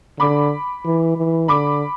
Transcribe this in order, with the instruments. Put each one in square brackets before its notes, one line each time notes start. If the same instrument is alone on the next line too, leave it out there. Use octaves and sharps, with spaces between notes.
[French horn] D3 [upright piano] B5 D6
[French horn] E3
E3
[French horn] D3 [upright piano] B5 D6